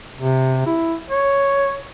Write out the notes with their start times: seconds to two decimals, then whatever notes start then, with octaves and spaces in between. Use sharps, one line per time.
0.16 C3
0.66 E4
1.10 C#5